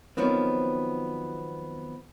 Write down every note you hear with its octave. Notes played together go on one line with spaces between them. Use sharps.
D#3 F3 F#3 B3 C4